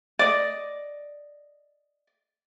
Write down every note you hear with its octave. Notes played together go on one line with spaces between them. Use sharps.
D5 D#5